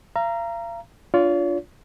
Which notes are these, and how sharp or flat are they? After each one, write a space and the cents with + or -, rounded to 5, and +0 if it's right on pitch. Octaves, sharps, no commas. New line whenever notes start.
F5 -40 A#5 +0
D4 +0 F4 +0 C#5 +45